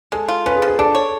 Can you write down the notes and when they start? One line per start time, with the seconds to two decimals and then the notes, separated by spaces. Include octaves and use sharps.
0.12 G#3 A4
0.28 F4
0.46 C#4 B4
0.56 G#4
0.62 F3
0.68 G#4
0.79 D4 A4
0.95 C#5